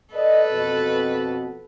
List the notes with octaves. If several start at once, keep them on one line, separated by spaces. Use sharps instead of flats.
A4 B4 D5 D#5
F2 B2